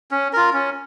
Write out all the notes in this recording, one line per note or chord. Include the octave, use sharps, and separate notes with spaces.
C#4
F4 A#4
C#4